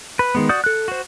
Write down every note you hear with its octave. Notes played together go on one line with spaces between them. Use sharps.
B4
D#3 G#3 B3
F#4 D5 F#5 D#6 G6
A4 F#6
F#4 C5